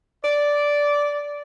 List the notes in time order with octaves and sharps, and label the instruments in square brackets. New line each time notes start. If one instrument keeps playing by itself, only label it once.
[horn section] D5